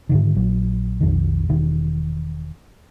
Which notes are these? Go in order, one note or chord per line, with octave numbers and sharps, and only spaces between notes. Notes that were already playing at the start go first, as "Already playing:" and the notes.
G#2 D3 D#3
A#1 F#3
B1 F2 D#3
E1 D#3